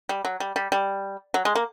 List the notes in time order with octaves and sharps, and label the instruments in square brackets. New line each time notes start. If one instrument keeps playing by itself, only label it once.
[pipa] G3
F#3
G3
G3
G3
F#3
G#3
A#3